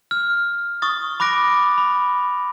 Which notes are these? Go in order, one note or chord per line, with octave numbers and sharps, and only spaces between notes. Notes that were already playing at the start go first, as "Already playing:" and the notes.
F6
C#6 D#6 A6
B5 D6 F#6 A#6 D7
B5